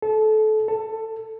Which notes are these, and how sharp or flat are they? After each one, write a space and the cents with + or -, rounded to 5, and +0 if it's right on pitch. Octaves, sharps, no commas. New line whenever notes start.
A4 -25
A4 +15